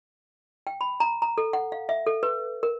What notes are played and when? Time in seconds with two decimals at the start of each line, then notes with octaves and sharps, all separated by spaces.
0.67 G5
0.81 B5
1.00 A#5
1.22 A#5
1.38 A4
1.53 F#5
1.72 F5
1.89 E5
2.07 A4
2.23 B4
2.63 A#4